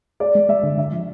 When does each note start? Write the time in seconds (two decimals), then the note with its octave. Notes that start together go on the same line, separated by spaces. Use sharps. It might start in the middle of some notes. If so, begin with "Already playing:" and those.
0.20 G#4 D5
0.35 G#3
0.49 G#3 E5
0.63 D3
0.78 D3 E5
0.92 F3